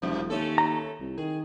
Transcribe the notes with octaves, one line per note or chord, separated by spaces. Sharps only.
E1 F#2 C3 F3
D#2 A3 C#4 A4
A#5
C2
D#3 G#4